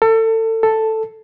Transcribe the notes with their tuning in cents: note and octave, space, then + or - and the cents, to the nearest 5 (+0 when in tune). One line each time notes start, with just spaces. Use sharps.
A4 +30
A4 +5